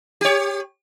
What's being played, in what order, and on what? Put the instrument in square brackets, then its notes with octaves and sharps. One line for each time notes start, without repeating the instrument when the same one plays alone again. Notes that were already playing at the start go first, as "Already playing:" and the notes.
[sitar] G4 C#5